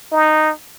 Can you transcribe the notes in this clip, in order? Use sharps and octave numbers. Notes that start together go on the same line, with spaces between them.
D#4